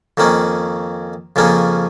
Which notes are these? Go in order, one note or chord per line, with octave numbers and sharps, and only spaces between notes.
F2 D#3 A#3 C#4
F2 C#3 F3 A#3 C#4